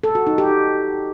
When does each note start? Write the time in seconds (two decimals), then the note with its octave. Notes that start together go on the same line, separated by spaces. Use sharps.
0.03 A4
0.15 F#4
0.27 D#4
0.38 G4